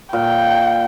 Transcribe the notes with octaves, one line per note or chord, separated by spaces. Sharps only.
A#2 G5